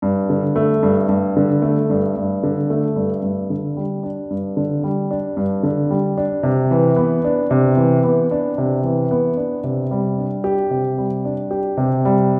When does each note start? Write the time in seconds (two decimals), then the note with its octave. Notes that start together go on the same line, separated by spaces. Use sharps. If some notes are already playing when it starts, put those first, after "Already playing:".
0.02 G2
0.30 D3
0.56 A3
0.83 G2
1.09 G2
1.37 D3
1.62 A3
1.90 G2
2.16 G2
2.43 D3
2.70 A3
2.96 G2
3.22 G2
3.50 D3
3.77 G3
4.03 D4
4.30 G2
4.57 D3
4.84 G3
5.11 D4
5.37 G2
5.63 D3
5.90 G3
6.17 D4
6.43 C3
6.71 E3
6.96 B3
7.24 D4
7.51 C3
7.77 E3
8.03 B3
8.31 D4
8.58 C3
8.84 E3
9.11 B3
9.37 D4
9.64 C3
9.91 G3
10.18 D4
10.44 G4
10.71 C3
10.98 G3
11.25 D4
11.51 G4
11.77 C3
12.05 G3